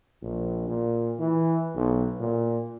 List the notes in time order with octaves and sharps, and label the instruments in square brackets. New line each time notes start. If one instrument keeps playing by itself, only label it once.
[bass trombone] A#1
A#2
E3
B1
A#2